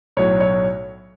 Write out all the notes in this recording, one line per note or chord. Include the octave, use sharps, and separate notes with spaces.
B1 A2 F#3 C#5
C#5